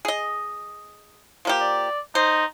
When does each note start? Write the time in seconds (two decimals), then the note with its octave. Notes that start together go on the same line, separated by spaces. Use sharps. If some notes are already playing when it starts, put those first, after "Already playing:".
0.05 G#4 D#5
1.45 F3 A#3 G4
1.61 D5
2.15 D#4 C5